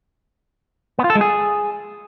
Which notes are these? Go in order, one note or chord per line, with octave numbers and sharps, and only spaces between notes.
B3
F4
A4
G#3
G#4